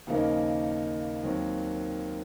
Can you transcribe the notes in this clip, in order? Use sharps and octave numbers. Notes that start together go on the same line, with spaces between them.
D#2 C#3 F3 A#3 D#4
D#2 D#3 F#3 C4